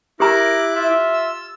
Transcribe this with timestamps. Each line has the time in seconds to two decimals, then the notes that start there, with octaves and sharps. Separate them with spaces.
0.20 E4 G4 A#4 A#5 D6 F#6
0.75 F4 E5
1.14 E6